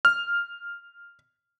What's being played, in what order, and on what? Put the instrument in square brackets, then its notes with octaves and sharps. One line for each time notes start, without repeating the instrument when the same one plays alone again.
[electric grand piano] F6